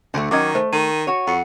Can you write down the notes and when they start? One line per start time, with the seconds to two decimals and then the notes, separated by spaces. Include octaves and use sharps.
0.14 D2 D3 A3
0.31 D#3 F#3 C#4 D#5 D6 G#6
0.55 A3 C5
0.73 D#3 D#7
1.07 F#4 C#5
1.27 F2 F#5 C#7